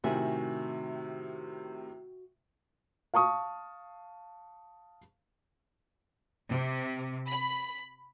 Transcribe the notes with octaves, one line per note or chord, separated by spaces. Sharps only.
A2 C3 D#3 F#4 E5 G#5
F5 A5 C#6 D#6
C3
B5